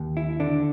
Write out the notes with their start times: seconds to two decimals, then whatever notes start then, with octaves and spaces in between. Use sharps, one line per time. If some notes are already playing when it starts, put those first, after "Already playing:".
Already playing: D#2
0.17 E4
0.40 D3 D4